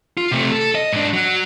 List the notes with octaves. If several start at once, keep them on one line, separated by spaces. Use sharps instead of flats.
F4
C3 A3
A4
D#5
G#2 D4
F#3